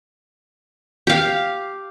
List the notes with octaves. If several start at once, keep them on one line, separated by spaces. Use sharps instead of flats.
G4 F5